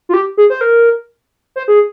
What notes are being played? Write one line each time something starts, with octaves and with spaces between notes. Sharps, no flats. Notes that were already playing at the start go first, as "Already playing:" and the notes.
F4
G4
G#4
C5
A#4
C5
G#4